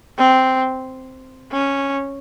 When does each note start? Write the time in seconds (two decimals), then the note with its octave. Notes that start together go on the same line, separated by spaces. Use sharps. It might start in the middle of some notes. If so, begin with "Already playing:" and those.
0.18 C4
1.52 C#4